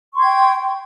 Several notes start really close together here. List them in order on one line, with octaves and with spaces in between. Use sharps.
C#6 C6 G#6 G5